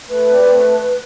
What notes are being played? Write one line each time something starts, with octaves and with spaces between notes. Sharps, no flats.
A3 B4
C4 G4 D5
A3